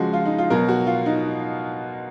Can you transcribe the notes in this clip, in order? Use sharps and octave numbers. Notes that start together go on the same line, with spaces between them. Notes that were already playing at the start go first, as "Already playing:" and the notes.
Already playing: C#3 F3 G#3 F#4
F4
D#4
F4
B2 F#3 A#4
F#4
F4
D#4